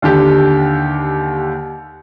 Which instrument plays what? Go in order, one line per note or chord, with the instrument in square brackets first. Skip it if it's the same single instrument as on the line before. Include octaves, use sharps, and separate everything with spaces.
[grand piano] D#2 D3 G4